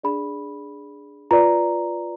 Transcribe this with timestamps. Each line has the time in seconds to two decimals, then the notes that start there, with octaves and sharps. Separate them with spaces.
0.03 D4 G#4 D5 B5
1.31 F4 B4 D5 A#5